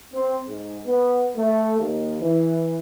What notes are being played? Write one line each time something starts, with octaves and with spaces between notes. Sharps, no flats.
C4
G#2
B3
A3
D#2
E3